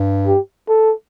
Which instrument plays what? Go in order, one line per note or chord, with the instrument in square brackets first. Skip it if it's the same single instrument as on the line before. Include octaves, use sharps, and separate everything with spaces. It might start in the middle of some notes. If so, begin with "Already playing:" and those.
Already playing: [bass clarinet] G2
[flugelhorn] G4
A4